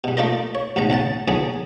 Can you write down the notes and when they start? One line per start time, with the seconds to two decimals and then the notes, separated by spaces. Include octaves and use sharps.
0.04 G2 B2
0.17 A3 A#3 D4 F4 A#4 D#5
0.55 C#5
0.76 A1 D2 G#2 B2 A#5
0.90 E2 C#3 F#5 A5
1.28 A#1 D3 F#3 B3 D4 G#4